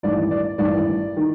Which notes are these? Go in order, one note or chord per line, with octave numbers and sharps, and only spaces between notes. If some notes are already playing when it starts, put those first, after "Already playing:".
A1 G2 D#3 D5
D5
A1 G2 D#3 D5
D#3